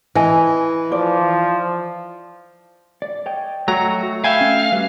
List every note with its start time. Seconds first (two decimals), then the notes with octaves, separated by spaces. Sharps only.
0.15 E3 D#5 G#5
0.92 F3 D5
3.02 D5
3.26 C#5 D#5 G5
3.68 F#3 A3 F#4 A#5
4.24 E5 F5 G5 G#5 B5
4.41 C#4
4.72 G3 B4